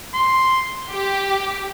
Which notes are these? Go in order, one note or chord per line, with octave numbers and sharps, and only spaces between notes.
C6
G4